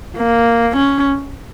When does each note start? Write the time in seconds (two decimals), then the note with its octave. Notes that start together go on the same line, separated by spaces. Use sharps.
0.17 A#3
0.76 C#4